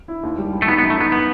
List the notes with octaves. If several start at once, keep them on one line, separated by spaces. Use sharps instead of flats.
E4
D#2
G3
G3
A3
B3 D#4
B3
F#2
A3
B3 D#4
B3